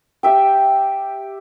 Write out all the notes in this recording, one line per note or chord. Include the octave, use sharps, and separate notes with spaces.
G4 E5 G5